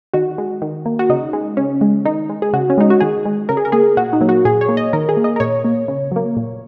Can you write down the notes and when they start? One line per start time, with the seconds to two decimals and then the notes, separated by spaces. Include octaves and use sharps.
0.13 D#3 F#4
0.38 G#3
0.62 D#3
0.86 A#3
0.99 F#4
1.09 C#3 D#4
1.33 G#3
1.57 C#3 C#4
1.81 G#3
2.05 D#3 D#4
2.29 G#3
2.42 G#4
2.53 C#3 F#4
2.70 C#4
2.78 G#3 D#4
2.90 F#4
3.00 D#3 G#4
3.25 G#3
3.49 C#3 A#4
3.57 G#4
3.65 A#4
3.72 A#3 G#4
3.97 A#2 F#4
4.13 D#4
4.21 F#3 A#3
4.29 F#4
4.45 A#2 G#4
4.61 C#5
4.69 A#3
4.77 D#5
4.93 D#3 A#4
5.09 G#4
5.17 A#3
5.24 D#5
5.36 A#4
5.40 A#2 C#5
5.64 A#3
5.88 C#3
6.12 F#3 A#3
6.36 A#2